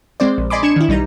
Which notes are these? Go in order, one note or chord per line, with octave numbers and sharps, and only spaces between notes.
G#3 C4 C5 D5
A#1
D5 D#5 G#5 B5 C6 D6
D4 G#6 C#7 E7
D#3 E4
B1 G3 D#4 A#5